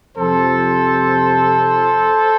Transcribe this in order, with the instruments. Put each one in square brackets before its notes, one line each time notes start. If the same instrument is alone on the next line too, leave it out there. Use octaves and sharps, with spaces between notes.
[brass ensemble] F2 C3 F3 A4 C5